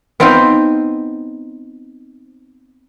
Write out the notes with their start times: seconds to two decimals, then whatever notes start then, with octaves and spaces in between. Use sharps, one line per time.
0.20 B3 C4 D#4 F4 C5